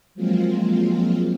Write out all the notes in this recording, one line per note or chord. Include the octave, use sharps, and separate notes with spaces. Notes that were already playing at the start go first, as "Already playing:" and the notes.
F3 F#3 G#3 A#3 C4 F4